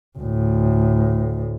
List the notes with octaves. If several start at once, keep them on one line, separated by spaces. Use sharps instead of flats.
D2 A2